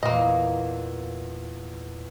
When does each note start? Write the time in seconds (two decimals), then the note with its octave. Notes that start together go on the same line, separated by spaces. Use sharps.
0.03 E2 A#2 A#3 D#5